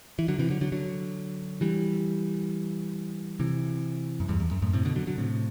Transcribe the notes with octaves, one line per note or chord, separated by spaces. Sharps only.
E3
D3 F#3
C3 E3
D3 F#3
D3 F#3
D3 F#3
E3 G3
C3 E3
F#2
E2 G2
E2
F#2
F#2 A2
A2 C3
B2 D3
D3 F#3
D3 F#3
A2 C3